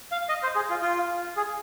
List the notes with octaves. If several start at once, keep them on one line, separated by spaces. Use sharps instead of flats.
F5
D#5
C5
G#4
F4
F4
G#4